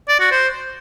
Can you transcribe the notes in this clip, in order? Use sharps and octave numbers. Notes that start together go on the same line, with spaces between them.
D5
F#4
C5